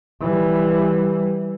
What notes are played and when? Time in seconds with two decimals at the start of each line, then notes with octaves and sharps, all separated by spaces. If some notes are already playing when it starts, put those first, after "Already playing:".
0.21 E3 G3